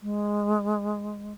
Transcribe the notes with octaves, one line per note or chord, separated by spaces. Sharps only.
G#3